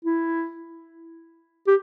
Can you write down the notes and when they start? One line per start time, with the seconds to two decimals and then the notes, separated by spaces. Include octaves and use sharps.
0.05 E4
1.67 G4